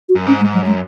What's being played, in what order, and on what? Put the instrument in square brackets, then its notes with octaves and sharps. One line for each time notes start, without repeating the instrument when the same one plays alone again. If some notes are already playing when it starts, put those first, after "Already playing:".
[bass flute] F#4
[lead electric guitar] F#2
[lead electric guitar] G#2 [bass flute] C#4
[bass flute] G#3
[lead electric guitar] G#2
[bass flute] F#3
[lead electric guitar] F#2 [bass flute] G#3